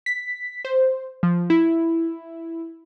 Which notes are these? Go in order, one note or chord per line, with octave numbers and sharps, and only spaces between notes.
B6
C5
F3
E4